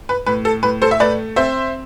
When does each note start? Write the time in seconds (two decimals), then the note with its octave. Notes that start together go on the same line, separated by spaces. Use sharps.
0.09 B4
0.26 A2 B4
0.45 A4
0.63 A2 B4
0.82 A4 C5
0.91 E5
1.00 A3 B4 D5
1.36 C4 C5 E5